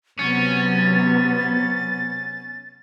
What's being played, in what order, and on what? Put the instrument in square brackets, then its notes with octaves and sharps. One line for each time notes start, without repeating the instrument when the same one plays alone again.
[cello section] C3 F#3 B3 [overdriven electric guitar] C#4 [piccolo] A6